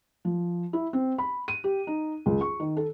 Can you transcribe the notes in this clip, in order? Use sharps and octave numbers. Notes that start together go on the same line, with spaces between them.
F3
E4
C4
B5
D#7
G4
D#4
C#2
C#6
D#3
A4